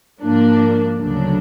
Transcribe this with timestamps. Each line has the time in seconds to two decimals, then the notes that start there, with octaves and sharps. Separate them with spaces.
0.20 G#2 F3 A#3 D4
0.97 D2 C#3 F#3 A3 D4